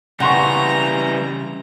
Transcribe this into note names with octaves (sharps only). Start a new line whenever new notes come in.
C#3 E3 G3 F#5 A#5 C6 C#6